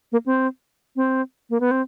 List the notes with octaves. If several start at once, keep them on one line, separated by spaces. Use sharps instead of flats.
A#3
C4
C4
A#3
B3
C4